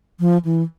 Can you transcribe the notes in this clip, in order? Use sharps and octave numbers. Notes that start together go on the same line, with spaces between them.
F3
E3